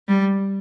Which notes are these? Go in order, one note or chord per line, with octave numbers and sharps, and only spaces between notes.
G3